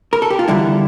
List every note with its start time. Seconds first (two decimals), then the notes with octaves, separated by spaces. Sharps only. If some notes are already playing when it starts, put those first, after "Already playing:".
0.13 A#4
0.22 A4
0.30 G4
0.39 F4
0.48 E2 D3 G3 E4